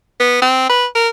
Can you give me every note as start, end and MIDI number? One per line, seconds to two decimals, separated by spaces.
0.20 0.40 59
0.42 0.68 60
0.69 0.86 71
0.95 1.09 70